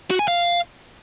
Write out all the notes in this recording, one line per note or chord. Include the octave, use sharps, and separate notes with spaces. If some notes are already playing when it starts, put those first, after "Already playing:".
F#4
G#5
F5